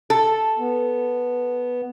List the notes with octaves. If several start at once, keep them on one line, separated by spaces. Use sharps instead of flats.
A4
B3